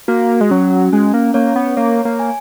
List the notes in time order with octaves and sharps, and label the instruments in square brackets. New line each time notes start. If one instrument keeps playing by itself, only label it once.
[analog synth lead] A#3 [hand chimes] F#4
[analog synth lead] G#3
[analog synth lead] F#3 [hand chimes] C#4
[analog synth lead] G#3 [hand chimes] C#4
[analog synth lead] A#3
[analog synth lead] A#3 [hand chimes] C#5
[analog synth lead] B3
[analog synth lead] A#3 [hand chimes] C#5
[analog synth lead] A#3
[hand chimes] G#5